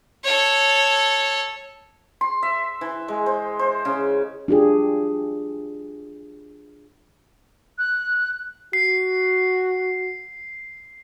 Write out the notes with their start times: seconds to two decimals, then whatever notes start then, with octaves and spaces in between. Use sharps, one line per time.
0.23 A4 C#5
2.21 C6
2.43 E5
2.81 E3
3.08 G#3
3.26 C5
3.59 C5
3.85 C#3
4.48 D4 F4 G4 G#4
7.78 F#6
8.73 F#4 C7